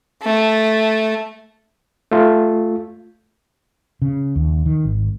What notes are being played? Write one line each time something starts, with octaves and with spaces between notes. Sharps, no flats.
A3
A3 F4
C#3
D#2
D#3
G#1